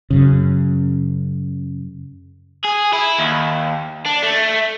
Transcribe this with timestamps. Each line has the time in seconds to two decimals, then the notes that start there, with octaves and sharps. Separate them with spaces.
0.10 F#2 C#3
2.64 G#4
2.93 E4
3.19 D#2
4.06 D4
4.23 A3